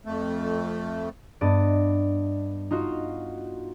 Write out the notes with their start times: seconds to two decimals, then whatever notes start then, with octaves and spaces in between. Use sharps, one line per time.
0.06 F2 A3
1.41 G2 B3 D5 D#5
2.71 D#4 F4 F#4 F5